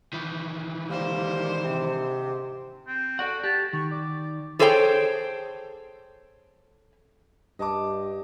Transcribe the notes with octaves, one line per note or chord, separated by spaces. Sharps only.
D#3 E3
D3 G3 G#3 A#3 C5
G#2 C3
C4
F#4 A4 D5 F#5
G4 A5
D#3 C#6
D5
G#4 A4 C5 C#5 F#5 G5
G2 D#5 A5 D6